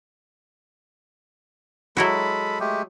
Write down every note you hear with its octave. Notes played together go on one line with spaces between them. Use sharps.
F#3 G#3 E4 F#4 A4 B5
G#3 A3 G4